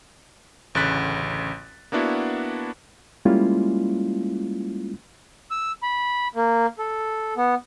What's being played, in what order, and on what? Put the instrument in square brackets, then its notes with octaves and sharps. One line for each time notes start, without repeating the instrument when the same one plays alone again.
[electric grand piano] A1 D2 C#3 F#6 A6 B6
A#3 B3 D4 E4 F#4
[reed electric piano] G3 G#3 A#3 C#4 E4 F4
[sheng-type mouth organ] E6
B5
A#3
A4
B3